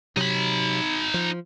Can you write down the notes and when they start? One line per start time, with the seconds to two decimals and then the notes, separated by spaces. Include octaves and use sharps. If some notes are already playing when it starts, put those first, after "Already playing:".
0.17 C3 F#3 D#4 B5
1.14 F3